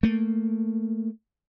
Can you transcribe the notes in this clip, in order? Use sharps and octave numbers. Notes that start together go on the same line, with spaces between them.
A3 A#3